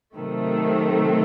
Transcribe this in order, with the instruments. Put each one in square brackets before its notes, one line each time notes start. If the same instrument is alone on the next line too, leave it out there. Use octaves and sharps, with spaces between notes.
[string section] C3 D#3 F#3 A3